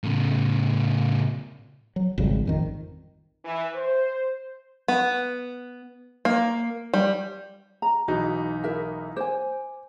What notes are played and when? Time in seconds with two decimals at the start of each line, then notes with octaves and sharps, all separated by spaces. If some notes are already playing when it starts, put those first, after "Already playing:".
0.03 A2 C#3
1.96 F#3
2.18 G#1 F2 C#3 G3
2.46 A1 F2 D#3
3.45 E3
3.75 C5
4.88 B3
6.25 A#3
6.93 G3
7.82 A#5
8.08 B1 E3 D#4 F#4
8.64 E4 A#4 E5
9.16 C5 G#5 D6